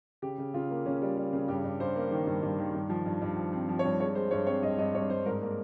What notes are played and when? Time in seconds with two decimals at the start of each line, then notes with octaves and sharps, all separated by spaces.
0.22 C#3 G4
0.38 C#3
0.54 C#3 F4
0.70 A#3
0.86 C#3 C#4
1.02 G3
1.17 G3
1.33 C#3
1.48 G2 G4
1.64 G2
1.80 G2 C5
1.96 A#3
2.11 D#3
2.27 G2
2.42 G2
2.58 D#3
2.74 G2
2.90 F3
3.06 G2
3.22 G2
3.37 F3
3.53 C4
3.69 F3
3.79 C#5
3.84 G2
4.00 G#3 C#5
4.15 G#3 C5
4.31 G2 C#5
4.46 C4 C#5
4.63 G2 D#5
4.79 G2 D#5
4.94 G2 C#5
5.10 G2 C5
5.26 G#2 A#4
5.42 A#3